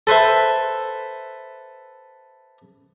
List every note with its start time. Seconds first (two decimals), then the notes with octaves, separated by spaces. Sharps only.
0.07 A4 B4 C5 E5